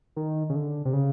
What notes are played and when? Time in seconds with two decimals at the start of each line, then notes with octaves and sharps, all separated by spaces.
0.16 D#3
0.50 C#3
0.55 D3
0.85 C3
0.93 C#3